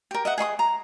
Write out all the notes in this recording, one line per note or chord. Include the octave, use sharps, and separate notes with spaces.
G4 A#4
D#5 E5 F#5
G#4 D#5 C6 D#6
A#5